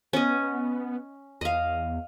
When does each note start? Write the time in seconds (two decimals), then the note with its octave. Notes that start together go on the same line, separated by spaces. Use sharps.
0.13 B3 C#4 D#5
1.41 E2 D#5 F5